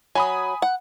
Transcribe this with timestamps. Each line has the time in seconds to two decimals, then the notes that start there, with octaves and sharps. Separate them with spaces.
0.15 F#3 G#5 B5 D#6
0.62 F#5